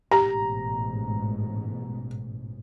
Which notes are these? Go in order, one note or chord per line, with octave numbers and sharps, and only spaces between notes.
A1 G#2 B2 G4 A#5